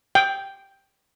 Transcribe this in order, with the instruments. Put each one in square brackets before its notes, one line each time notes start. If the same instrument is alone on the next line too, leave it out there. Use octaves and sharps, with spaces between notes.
[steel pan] G5